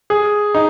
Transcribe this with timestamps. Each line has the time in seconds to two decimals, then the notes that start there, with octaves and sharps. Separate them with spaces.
0.10 G#4
0.55 D#4